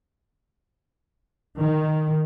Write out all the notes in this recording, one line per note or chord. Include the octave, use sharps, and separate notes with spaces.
D#3